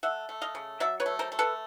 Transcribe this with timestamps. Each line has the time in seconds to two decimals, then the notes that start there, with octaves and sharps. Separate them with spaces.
0.03 A3 E5 F#5
0.29 A3
0.42 D#5 F5
0.55 C#3
0.80 F#3 D5 E5
1.00 B4 C#5
1.06 A3
1.19 A#4 C5
1.32 A3
1.39 A4 B4